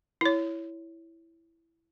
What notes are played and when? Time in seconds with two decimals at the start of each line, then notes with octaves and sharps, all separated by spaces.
0.21 E4 C#5